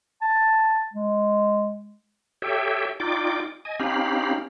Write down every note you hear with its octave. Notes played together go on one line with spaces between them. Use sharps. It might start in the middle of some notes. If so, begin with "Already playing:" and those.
A5
G#3
G4 A4 C#5 E5 G5
D#4 F4 D5 G5 D6
D#5 G#5
C4 C#4 D#4 G4 F5 B5